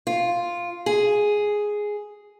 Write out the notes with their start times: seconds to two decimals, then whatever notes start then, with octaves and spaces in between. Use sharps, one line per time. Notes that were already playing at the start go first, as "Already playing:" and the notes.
0.07 F4
0.86 G#4